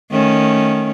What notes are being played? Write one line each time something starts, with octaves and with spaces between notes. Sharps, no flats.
D#3 A3 C#4